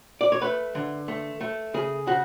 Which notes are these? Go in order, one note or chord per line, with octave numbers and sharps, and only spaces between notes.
D5
C#5
A3 B4
D3
A3
A3
C#3 G#4
C#3 F#4